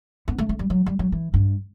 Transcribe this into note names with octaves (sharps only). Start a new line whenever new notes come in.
B3
A3
A3
G3
F#3
G3
F#3
E3
G2